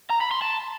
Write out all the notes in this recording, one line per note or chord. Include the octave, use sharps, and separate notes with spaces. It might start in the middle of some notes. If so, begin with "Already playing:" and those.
A#5
B5
C6
A5